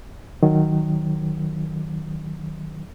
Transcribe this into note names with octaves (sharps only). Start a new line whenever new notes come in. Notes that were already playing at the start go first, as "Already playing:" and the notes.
D#3 F#3